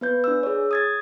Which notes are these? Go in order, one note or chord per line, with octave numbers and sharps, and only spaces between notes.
B3 B4 G6
D4 E6
G#4 C#5
D#6 G#6 A6